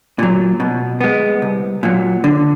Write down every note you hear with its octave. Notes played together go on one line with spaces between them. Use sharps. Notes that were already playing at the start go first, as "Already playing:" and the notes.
A#2 F#3
B2
G#3 B3
C2
A#2 F#3
D3